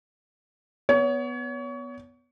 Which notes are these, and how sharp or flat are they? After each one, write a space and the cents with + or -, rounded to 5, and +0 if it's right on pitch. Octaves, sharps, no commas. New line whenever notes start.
B3 +0 C#5 +30